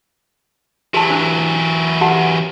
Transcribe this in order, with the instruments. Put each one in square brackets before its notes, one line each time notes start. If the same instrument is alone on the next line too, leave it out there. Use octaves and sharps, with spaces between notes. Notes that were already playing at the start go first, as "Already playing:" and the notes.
[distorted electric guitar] E3 F#3 [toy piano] G4 A5
[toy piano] D4 C5
G4 F#5 A5